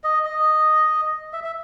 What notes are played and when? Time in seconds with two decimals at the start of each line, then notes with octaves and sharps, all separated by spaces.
0.04 D#5
0.25 D#5
1.33 E5
1.44 E5